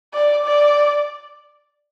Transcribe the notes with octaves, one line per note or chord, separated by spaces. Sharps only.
D5
D5